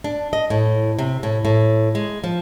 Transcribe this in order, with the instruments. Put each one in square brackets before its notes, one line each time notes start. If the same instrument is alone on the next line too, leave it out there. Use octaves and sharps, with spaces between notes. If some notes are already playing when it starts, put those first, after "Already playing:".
[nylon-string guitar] D4
D#5
A2
C3
A2
A2
G#3
F3